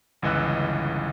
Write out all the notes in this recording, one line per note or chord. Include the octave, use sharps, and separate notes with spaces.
G1 C#2 E3 D#5 E6 F#6